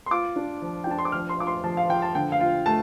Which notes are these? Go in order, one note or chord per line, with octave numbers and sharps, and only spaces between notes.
C6
F4 D6
D4
F3
G5
D4 A5
C6
D6
F3 F6
C6
F4 D6
C6
F3 A5
F5
F3 G5
A5
D3 G5
F5
F4
A3 A5